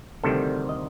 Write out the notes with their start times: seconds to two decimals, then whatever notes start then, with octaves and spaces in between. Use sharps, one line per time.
0.23 D2 C3 D#3 G3 A4
0.69 D#5